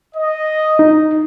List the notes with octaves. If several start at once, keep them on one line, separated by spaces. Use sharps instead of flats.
D#5
D#4